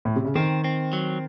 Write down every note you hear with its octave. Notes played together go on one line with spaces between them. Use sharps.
A2
C3
C#3
D#3 C4
C4
F#3